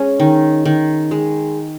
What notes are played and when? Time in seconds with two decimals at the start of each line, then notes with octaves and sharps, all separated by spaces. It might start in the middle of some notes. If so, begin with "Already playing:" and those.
Already playing: G#3 C#4
0.20 D#3
0.65 D#3
1.11 G#3